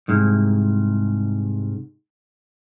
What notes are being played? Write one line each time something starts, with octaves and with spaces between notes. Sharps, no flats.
C2 G#2